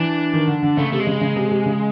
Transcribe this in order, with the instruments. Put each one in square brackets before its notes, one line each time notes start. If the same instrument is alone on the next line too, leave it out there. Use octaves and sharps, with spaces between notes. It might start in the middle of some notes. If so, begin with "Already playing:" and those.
Already playing: [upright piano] E3 [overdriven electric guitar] D4
[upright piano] D#3
D3
D3
[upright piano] C#3 [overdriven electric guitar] A3
[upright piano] C3 [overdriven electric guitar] A3
[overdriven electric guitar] G#3
[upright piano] C#3
C#3
C3
C3
C#3